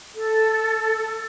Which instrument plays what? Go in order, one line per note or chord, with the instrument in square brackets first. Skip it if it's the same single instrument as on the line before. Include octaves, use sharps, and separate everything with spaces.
[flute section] A4